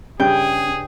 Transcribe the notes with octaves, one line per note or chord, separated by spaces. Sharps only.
G2 C#3 C#4 G#4 G5